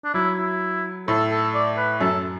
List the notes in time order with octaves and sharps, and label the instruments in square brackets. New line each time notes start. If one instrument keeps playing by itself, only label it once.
[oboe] D4
[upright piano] F#3 [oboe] E4
[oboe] E4
[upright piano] A2 [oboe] A4
[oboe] A4
D5
B4
[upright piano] F#2 [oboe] A4